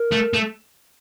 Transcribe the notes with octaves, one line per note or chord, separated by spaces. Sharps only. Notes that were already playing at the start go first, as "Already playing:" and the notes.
Already playing: A#4
A3
A3